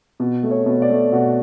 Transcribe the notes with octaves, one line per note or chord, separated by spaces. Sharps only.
B2
A3
C#5
B2
D5
A3
B2 F#4